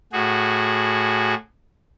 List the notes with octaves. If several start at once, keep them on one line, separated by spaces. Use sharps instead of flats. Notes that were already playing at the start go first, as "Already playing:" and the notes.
A2 F#4 G#4